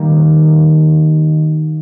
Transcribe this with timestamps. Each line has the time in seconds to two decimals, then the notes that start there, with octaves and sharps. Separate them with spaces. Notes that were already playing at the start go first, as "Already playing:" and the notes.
Already playing: D#3 G3 A#3